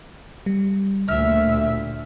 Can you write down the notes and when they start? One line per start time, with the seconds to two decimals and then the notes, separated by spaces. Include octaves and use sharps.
0.46 G3
1.09 D2 A#2 E5 E6 F6